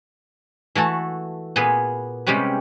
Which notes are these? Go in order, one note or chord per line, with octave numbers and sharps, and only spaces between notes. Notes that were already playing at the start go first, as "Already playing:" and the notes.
E3 A3 F#4 A4
A#2 B3 G#4 B4
C3 G3 G#3 C#4 G4 B4